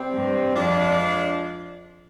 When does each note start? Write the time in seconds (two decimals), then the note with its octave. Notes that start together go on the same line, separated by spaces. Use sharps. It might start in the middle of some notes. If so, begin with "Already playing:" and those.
Already playing: C3 G3 C4
0.14 G2
0.55 F2 F3 G#3 D4